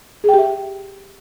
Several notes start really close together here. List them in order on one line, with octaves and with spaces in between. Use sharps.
G#4 G5 G4 E5